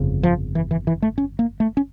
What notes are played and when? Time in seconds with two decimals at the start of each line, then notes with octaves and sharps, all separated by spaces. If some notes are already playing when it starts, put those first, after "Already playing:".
Already playing: G1 F2 C#3
0.23 F3
0.55 E3
0.71 E3
0.87 E3
1.02 A3
1.18 C#4
1.39 A#3
1.60 A3
1.77 C#4